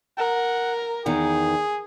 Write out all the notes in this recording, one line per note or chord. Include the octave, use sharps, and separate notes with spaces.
A#4 F#5
E2 D#3 G#4 F#5